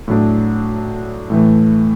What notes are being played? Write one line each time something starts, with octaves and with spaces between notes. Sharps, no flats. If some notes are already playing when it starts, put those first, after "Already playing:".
A2 F#3 D4
A2 E3 A3